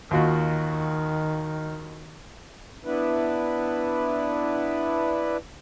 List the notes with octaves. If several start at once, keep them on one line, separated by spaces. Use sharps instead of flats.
D#2 D#3 F4 F#4
B3 D4 E4 B4